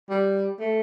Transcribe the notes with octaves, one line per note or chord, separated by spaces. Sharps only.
G3
A3